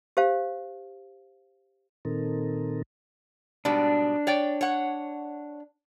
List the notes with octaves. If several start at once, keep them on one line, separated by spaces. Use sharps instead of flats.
G4 C5 F5
A#2 D#3 C4 D#4 A4 A#4
G#2 B2 G3 D4
C#5 D5 G5
C#5 F#5